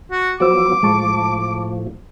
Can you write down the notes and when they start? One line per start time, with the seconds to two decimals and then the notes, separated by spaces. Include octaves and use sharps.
0.11 F#4
0.40 F3 F#3 B3 F#4 C5 D6 E6
0.83 A2 F3 G#3 A5 C#6